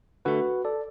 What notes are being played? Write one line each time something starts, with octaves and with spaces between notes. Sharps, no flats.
D3 A3 F#4 B4
A4 D5